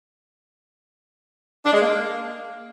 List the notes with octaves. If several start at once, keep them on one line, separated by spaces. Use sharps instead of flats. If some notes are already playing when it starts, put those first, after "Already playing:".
D4
G#3
A#3